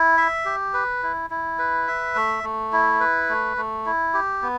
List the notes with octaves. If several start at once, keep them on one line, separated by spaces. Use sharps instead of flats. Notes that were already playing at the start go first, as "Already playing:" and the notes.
Already playing: E4
E5
G4
B4
E4
E4
B4
E5
A3
A3
E4
B4
A3
A3
E4
G4
B3